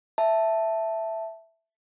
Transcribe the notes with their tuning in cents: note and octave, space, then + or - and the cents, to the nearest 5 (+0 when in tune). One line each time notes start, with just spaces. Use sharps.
E5 +0 A5 +0